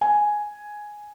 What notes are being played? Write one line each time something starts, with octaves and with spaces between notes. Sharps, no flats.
G#5